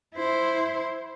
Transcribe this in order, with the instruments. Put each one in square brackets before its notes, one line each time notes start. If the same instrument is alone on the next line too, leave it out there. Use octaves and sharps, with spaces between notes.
[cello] E4 C5